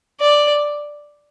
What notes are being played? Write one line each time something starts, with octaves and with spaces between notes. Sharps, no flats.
D5